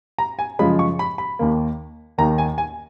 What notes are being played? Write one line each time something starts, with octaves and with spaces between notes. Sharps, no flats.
A#5
G#5
F#2 C#3 F3 G#3 B5
C#6
B5
B5
D#2 D#3 A#3
D#2 D#3 A#3 A#5
G#5
G#5